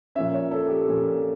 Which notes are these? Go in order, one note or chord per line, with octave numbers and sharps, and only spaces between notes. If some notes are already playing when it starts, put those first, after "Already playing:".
A#2 F3 C#4 E5
C#5
A4
G4
A#2 F3 C#4